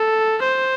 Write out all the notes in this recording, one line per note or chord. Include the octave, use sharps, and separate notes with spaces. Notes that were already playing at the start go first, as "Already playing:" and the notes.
Already playing: A4
C5